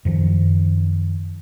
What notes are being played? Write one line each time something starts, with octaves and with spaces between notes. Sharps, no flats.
F#2 D#3 F3